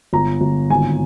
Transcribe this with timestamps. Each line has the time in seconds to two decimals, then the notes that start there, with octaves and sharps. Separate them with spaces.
0.13 G1 A#5
0.41 G1
0.70 G#1 G#5